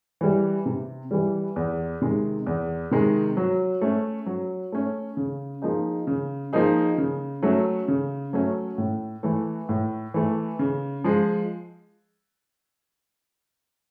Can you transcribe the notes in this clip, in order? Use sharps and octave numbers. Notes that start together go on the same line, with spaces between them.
E3 G3
C3
E3 G3
E2
C3 D#3 G#3
E2
C3 D#3 G#3
F#3
A3 C#4
F#3
A3 C#4
C#3
F3 A#3 D#4 G#4
C#3
F3 A#3 D#4 G#4
C#3
F#3 A3 C#4
C#3
F#3 A3 C#4
A2
E3 A3
A2
E3 A3
C#3
F3 G#3